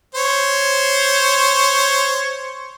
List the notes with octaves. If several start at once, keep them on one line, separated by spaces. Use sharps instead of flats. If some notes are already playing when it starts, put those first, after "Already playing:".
C5 C#5